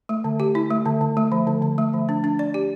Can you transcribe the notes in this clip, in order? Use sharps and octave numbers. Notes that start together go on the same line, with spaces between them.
A3
D3
G4
E4
A3
D3
D3
A3
F3
D3
D3
A3
F3
D4
D4
D5
G4